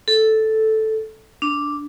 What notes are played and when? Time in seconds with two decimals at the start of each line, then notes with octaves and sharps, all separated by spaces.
0.08 A4
1.42 D4